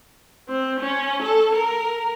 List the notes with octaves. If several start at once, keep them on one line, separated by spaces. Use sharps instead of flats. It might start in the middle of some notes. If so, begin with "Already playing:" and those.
C4
C#4
A4
A#4